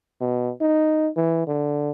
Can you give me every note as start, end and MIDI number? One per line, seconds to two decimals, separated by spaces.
0.21 0.51 47
0.61 1.09 63
1.17 1.44 52
1.47 1.91 50